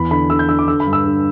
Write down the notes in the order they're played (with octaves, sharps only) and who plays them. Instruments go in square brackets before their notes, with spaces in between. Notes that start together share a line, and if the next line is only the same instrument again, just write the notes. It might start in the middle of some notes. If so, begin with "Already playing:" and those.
Already playing: [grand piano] E2 B5
D3 B5
D3 E6
G6
D3 E6
D6
D3 E6
B5
G2
E6
D3